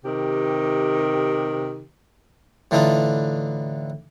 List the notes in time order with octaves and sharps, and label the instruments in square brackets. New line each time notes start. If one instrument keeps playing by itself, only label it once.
[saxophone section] C3 D#3 G4
[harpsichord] A2 D3 E3 D4 D#4 F4